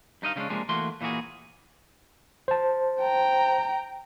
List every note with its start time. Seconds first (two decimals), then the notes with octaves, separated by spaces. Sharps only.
0.22 G2 D#4 D#5 F5
0.36 C#3 G3 G#3 C#4 D4
0.50 C3 F3 G#3 A#3 D4
0.69 E3 A3 A#3 F#4 C6
1.01 A#2 E3 A#3 F#4 G#4
2.48 C5 A5
3.01 G5 A#5